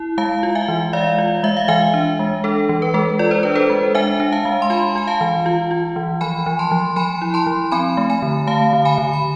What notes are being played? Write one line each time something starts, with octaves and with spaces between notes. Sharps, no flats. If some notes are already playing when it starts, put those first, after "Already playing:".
Already playing: E4
G#3 F5 A5
F4
E5 G#5
E3
G#3 D5 F5
F4
G#3 E5
F5
E3 E5 G#5
D4
G#3
D4 A4
E3
B4
G#3 A4
F4 D5
C5
D4 B4
A4 C5
G#3
D4 E5 G#5
D4
F5 A5
G#3
C6
F4 G#5 B5
F4 G#5
F5 A5
E3
F4
F4
E3
F3 G#5 B5
F3
A5 C6
F3
F3 G#5 B5
E4
A5 C6
F3
C4 G#5 B5
A3
G#5 B5
D3
A3 F5 A5
D3
G#5 B5
D3
B5